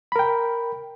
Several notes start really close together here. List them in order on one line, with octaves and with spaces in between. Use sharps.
B5 A#4 G5